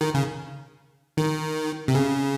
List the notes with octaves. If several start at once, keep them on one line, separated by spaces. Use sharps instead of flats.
D#3
C#3
D#3
C3
C#3